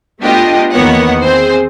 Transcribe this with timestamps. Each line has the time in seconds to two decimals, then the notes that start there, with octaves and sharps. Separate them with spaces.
0.22 A3 B3 D4 F4 G4 D#5
0.73 E2 D#3 A#3 B3 C#5 F#5
1.21 C4 G#4 C5